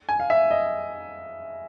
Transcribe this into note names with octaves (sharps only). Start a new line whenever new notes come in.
G#5
F5
E5
D#5